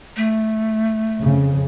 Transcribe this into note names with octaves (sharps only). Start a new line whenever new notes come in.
A3
F2 C#3